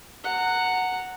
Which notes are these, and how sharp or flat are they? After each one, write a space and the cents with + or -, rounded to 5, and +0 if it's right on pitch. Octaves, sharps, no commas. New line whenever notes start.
F#5 +0 A#5 -20